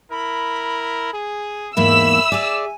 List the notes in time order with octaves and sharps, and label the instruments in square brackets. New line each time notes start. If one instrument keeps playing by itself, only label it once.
[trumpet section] E4 A#4 [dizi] B5
[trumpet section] G#4
[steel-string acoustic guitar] E2 G#2 A#3 [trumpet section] E5 [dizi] B5 [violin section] E6
[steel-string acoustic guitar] G#4 D5 [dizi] G#5